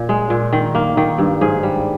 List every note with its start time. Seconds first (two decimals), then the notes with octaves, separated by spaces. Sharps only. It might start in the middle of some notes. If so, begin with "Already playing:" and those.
Already playing: A#2
0.09 G#3
0.30 A#2
0.53 D#3
0.75 A#3
0.97 D#3
1.18 G2
1.41 G#2 G#4
1.63 G3